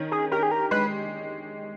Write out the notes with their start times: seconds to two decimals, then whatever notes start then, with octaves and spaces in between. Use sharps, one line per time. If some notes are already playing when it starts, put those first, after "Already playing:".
Already playing: D#3 C#4
0.12 G#4
0.31 G4 A#4
0.43 G#4
0.52 A#4
0.71 G#3 B4